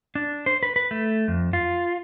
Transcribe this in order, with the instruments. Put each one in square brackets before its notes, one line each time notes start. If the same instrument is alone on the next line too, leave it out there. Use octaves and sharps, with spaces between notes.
[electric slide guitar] D4
C5
B4
B4
A3
F2
F4